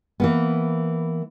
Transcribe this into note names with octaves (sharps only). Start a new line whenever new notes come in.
E3 A#3 B3